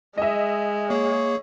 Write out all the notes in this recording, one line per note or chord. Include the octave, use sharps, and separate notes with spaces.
G#3 D#5 E5
A#3 G#4 C#5